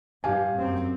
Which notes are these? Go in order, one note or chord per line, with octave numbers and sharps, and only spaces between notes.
G2 G4 F5 G#5
F#2 C4